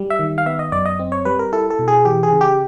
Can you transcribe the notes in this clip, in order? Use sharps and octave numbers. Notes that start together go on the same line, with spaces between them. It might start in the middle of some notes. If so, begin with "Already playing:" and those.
Already playing: G3
E5
D#3
F5
B3 E5
D#5
F#2 D5
D#5
C4
C#5
G3 B4
A#4
E4 A4
A4
B2
G#4
E3 G4
G#4
C#3
G4